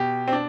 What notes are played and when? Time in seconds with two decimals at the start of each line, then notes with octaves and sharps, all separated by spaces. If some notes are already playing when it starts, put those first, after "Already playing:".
Already playing: B2 G4
0.28 C4
0.33 D4